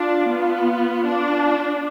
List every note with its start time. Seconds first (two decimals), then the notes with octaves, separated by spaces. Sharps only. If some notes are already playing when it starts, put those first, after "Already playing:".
Already playing: D4 F4
0.29 B3
1.06 D4